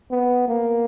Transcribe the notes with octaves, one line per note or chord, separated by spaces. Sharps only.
B3
A#3